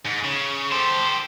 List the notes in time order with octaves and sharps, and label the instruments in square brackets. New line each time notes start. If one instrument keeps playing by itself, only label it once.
[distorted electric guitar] G#2
C#3
[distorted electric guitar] G4 A4 [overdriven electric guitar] C5